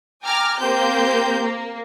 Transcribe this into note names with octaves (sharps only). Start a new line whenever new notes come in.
G5 G#5 A#5 D6 F6
A#3 C4 G4 C5 G6
A#3